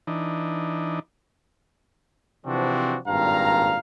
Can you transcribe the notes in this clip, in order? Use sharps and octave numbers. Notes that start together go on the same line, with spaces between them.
E3 D4 D#4
C3 E3 F3 C4 D4 F#4
G#1 G2 A#2 F5 A#5